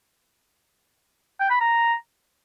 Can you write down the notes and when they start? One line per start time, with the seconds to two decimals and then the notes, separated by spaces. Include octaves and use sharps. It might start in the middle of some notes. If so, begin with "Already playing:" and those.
1.40 G5
1.50 B5
1.60 A#5